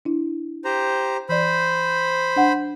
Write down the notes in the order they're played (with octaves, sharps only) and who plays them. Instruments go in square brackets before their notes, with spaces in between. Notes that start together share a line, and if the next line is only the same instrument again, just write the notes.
[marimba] D4 E4
[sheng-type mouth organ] G4 C5 A#5
[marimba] E3 D5 [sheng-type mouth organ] C5 B5
[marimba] D4 F#5